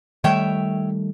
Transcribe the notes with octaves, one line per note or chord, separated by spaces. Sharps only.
D#3 G3 A3 C#5 E5 G5